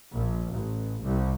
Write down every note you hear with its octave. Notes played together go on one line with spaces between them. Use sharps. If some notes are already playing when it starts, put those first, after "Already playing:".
A#1
A1
C2